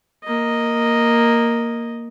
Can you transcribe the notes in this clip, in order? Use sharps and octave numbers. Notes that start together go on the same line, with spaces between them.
A#3 D#5